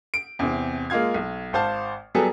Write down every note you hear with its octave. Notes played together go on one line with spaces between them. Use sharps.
D7
E2 C3 C4
G#3 A#3 F4 F5 G#6
B1
G#1 C5 F5 A5
F#3 G3 B3 G#4 A4